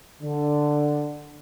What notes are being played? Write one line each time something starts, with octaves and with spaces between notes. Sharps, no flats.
D3